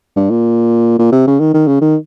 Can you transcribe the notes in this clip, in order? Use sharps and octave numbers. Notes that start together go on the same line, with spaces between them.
G2
A#2
A#2
C3
C#3
D#3
D#3
C#3
D#3